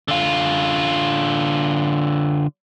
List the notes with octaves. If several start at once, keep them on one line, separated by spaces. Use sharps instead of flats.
D3 F4